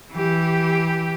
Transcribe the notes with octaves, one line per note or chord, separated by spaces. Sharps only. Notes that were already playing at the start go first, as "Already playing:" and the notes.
E3 G4